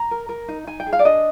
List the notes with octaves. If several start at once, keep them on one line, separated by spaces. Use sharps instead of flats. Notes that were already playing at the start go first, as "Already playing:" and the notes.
Already playing: A#5
A#4
A#4
D#4
D#4 G#5
G5
G#4
F5
D5
D4 D#5